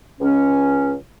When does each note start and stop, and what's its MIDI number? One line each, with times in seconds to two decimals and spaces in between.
0.21 0.96 37
0.21 0.96 61